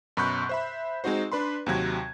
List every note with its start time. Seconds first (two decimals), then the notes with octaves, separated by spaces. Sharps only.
0.17 F#2 B2 B5 C#6 F#6 G6
0.49 C5 E5 B5
1.04 G#3 C4 D#4 F#4 C5
1.32 D4 B4 B5 C6
1.66 D#2 C3 F#3 G#6